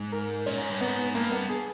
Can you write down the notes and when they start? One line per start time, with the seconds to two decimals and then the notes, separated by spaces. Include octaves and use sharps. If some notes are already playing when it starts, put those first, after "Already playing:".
Already playing: G#2
0.12 A#4
0.46 A#2 C#4
0.58 G#2
0.70 G2
0.81 G#2 B3
1.15 G2 A#3
1.32 B3
1.49 G#4